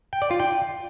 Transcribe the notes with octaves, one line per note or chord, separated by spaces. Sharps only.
G5
D5
F4
G5